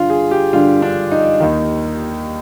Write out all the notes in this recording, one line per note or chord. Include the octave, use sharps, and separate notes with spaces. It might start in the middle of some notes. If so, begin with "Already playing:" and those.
Already playing: G2 D3 F4
G#4
G4
G2 D3 F4
D4
D#4
D#2 D#3